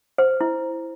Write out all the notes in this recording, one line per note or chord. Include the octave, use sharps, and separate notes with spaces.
C5
E4